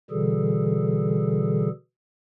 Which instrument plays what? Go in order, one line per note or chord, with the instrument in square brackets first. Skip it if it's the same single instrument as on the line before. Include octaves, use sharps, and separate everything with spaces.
[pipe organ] B2 D3 E3 G3 G#4 A4